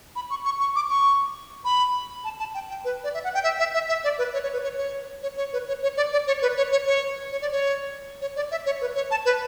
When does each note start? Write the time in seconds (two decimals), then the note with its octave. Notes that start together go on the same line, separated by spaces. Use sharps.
0.16 B5
0.30 C#6
0.45 C#6
0.60 C#6
0.76 D6
0.90 C#6
1.65 B5
2.24 A5
2.39 A5
2.54 G5
2.69 G5
2.85 B4
3.04 D5
3.14 E5
3.24 F#5
3.34 G5
3.44 E5
3.59 E5
3.74 E5
3.89 E5
4.04 D5
4.19 B4
4.33 C#5
4.43 C#5
4.53 B4
4.63 C#5
4.78 C#5
5.23 C#5
5.37 C#5
5.53 B4
5.68 C#5
5.83 C#5
5.97 D5
6.12 D5
6.27 C#5
6.42 B4
6.57 C#5
6.72 C#5
6.87 C#5
7.32 C#5
7.42 D5
7.52 C#5
8.21 C#5
8.36 D5
8.51 E5
8.66 C#5
8.81 B4
8.95 C#5
9.11 A5
9.25 B4